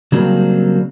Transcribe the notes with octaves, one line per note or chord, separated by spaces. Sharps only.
C#3 F#3 G3 A#3 C4 D4